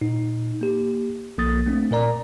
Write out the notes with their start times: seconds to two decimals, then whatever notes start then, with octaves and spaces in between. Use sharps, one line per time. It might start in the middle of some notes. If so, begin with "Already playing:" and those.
0.01 A#2 D#4
0.61 A#3 G4
1.38 B1 F3 A#3 D#6 A6
1.66 A3 C4 D4
1.91 A#2 A#4 D5 A#5